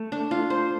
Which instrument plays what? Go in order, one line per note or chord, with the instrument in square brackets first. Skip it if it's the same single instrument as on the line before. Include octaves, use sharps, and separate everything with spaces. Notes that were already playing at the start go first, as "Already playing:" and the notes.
Already playing: [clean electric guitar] A3
[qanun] D4
F4
C5